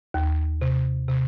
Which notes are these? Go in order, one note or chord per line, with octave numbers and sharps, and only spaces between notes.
D#2
C3
C3